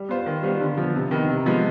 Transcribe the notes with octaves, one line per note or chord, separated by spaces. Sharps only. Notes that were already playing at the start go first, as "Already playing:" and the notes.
Already playing: G3
B3 F4 C5
D#3
G3 B3 F4 C5
D3
F3 B3
C3
D#3 B3 D#4
C3
F3 G#3 B3